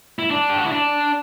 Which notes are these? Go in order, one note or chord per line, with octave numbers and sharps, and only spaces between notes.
E4
D4
G4
F#4
E4
D4